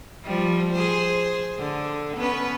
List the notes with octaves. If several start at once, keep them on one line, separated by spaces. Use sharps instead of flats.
F3 G3
G#4 C5
D3
B3 C#4 B4